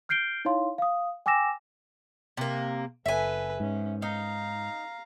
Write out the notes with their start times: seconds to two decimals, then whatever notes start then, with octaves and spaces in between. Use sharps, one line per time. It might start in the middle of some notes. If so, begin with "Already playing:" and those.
0.09 F6 G6 C7 D7 G7
0.45 D#4 E4 C#5 F5 C6
0.78 F5 D#6
1.26 G5 G#5 D6 E6 A#6 E7
2.37 C3 A#3
3.06 F#1 A4 B4 E5 G#5
3.60 G#2 C#4
4.02 D#4 F5 A#5